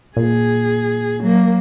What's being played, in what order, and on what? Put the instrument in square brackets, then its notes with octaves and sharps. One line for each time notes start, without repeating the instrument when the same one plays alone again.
[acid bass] A#2 [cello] G#4
[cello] F#3 A#3